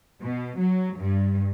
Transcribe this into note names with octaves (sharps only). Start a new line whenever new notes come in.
B2
F#3
G2